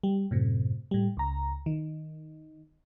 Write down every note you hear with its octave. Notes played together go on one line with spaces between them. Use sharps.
G3
F#2 A2 C3
A2 G3
C#2 A#5
D#3